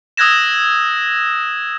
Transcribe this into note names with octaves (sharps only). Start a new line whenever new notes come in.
D#6 E6 F#6 G#6 A#6 E7